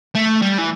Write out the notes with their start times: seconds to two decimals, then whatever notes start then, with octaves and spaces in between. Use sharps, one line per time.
0.15 A3
0.42 G3
0.58 E3